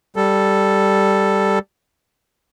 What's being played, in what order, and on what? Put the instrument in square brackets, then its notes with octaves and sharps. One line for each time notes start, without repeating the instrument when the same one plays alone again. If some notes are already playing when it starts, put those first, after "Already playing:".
[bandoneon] G3 A4